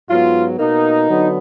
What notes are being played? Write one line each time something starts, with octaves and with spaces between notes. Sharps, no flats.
G#2 F#3 B3 F4
B2 A#3 D#4
D3 F#3 B3